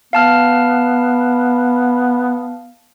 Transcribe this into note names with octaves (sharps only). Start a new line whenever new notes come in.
B3 F5 A5 F6